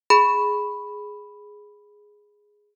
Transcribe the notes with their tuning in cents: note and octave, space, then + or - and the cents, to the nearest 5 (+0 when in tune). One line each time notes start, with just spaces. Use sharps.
G#4 +0 B5 +0